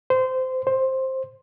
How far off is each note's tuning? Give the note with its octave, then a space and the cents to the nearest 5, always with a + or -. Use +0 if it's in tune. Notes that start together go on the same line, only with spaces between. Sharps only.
C5 -20
C5 +10